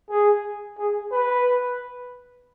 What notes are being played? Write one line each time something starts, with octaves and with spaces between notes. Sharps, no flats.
G#4
G#4
B4